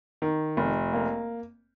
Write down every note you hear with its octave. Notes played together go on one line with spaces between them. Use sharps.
D#3
F1
A#3